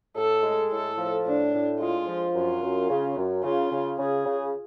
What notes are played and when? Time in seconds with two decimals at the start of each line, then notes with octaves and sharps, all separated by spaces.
0.16 A2 A4
0.44 G#3
0.71 A2 A4
0.98 F3
1.25 A2 D4
1.53 A2
1.80 G#3 F4
2.07 F3
2.34 F#2 F4
2.62 F#2
2.90 C#3
3.17 F#2
3.44 C#3 F4
3.71 C#3
3.99 C#3 G#4
4.26 C#3